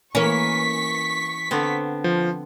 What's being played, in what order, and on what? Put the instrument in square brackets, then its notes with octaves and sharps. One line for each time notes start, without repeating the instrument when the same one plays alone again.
[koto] E3 [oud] A#3 C#4 [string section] C#6 B6
[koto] D3 B3 C4
[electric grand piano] F3